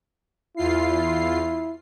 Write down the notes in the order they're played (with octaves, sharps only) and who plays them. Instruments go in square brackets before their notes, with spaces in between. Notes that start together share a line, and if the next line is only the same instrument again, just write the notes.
[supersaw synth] E2 F4 C7 [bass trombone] E4